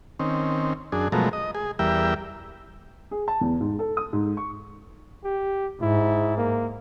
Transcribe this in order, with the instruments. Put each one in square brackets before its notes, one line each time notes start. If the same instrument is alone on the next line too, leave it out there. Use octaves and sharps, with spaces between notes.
[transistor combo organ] D#3 C4 C#4
F#2 D4 G#4
B2 F3 F#3 G#3 A3 A#4
D#5
G#4
E2 G3 A#4 E5 G5
[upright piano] G#4
A5
E2
G#2
A4
D#6
G#2
C#6
[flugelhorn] G4
[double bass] G#2 [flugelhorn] E4
[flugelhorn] A#3